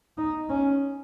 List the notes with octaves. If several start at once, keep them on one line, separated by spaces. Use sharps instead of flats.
D#4
C#4